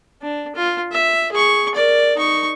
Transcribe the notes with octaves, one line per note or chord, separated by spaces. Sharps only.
D4
F4
E5
G#4 C#6
A#4 D5
D#4 C#6